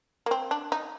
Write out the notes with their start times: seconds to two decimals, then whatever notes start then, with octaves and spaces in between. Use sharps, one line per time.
0.26 A#3
0.31 C4
0.51 D4
0.72 D#4